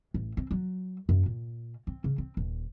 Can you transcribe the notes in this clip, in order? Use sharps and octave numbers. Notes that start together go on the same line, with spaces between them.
A1
C4
F#3
F#2
A#2
C4
C#3
C4
D#1